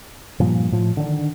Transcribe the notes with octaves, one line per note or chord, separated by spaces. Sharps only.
G2 A#2 F3
A2 F3
D3 D#3 D4